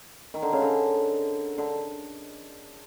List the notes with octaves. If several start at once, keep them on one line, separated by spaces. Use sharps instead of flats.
D#3
D3
C#3
D3
D3